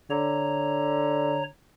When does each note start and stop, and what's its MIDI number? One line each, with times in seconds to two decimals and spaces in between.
0.10 1.48 50
0.10 1.43 73
0.10 1.43 82